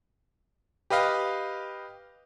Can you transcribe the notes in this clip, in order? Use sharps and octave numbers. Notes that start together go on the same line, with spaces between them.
G4 B4 D#5 F5